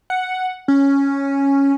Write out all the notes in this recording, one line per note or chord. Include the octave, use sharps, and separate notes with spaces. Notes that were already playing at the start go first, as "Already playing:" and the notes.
F#5
C#4